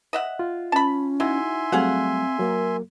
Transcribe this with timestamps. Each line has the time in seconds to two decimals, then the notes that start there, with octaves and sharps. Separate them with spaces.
0.13 D#5 E5 F#5
0.39 F4
0.72 C#4 A5 B5
1.20 F#3 D#4 E4 E5 F#5 G#5 C6
1.72 F#3 G3 A3 C4 G#4 F5 F#5
2.40 F#3 A#3 A#4